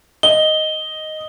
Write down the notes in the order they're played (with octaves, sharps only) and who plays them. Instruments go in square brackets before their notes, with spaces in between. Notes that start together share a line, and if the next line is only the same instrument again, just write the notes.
[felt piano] D#5 [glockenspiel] G7